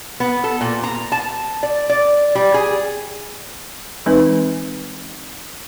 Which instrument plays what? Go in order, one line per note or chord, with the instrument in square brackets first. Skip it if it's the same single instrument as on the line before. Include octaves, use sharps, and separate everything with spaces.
[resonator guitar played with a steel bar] B3
A4
A#2
A#5
A5
D5
D5
G3
G#4
[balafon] E3 G#3 C4 D#4 B4